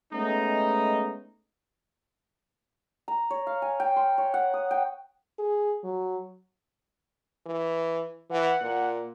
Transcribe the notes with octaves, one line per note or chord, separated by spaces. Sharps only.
G#3 A3 B3 C#4 D#4
A#5
C#5
F5
G#5
G5
C6
C#5
F#5
D#6
G5
G#4
F#3
E3
E3 F#5
A#2